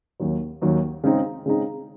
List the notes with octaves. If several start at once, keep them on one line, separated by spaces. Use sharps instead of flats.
D#2 D#3 F#3
D#2 D#3 F#3
C#3 G#3 C4 D#4
C#3 G#3 C4 D#4